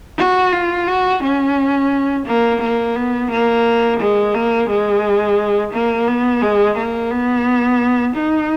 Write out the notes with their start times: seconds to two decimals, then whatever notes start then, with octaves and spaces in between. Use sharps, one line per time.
0.18 F#4
0.52 F4
0.87 F#4
1.23 C#4
2.26 A#3
2.62 A#3
2.96 B3
3.31 A#3
4.00 G#3
4.35 A#3
4.70 G#3
5.74 A#3
6.08 B3
6.42 G#3
6.77 A#3
7.11 B3
8.15 D#4